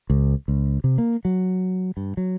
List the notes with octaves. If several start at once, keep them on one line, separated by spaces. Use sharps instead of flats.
C#2
C#2
C3
A#3
F#3
G2
F#3